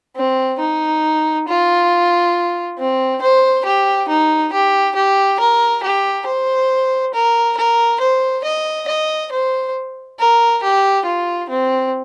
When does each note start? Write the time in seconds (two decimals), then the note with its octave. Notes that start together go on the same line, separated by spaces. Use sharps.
0.16 C4
0.60 D#4
1.48 F4
2.78 C4
3.22 C5
3.65 G4
4.08 D#4
4.53 G4
4.96 G4
5.40 A#4
5.83 G4
6.26 C5
7.14 A#4
7.58 A#4
8.01 C5
8.44 D#5
8.88 D#5
9.32 C5
10.19 A#4
10.63 G4
11.06 F4
11.50 C4